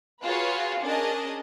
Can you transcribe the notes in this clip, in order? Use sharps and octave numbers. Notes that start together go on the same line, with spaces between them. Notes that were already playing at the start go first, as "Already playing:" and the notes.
F4 F#4 G#4 B4 C#5 F5
C#4 D4 G#4 A#4 D#5 A5